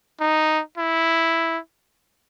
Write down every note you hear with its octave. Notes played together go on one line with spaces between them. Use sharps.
D#4
E4